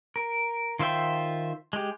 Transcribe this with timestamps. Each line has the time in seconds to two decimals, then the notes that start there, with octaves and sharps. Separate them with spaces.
0.16 A#4
0.79 D#3 F4 C5 E5 G5
1.73 G#3 G4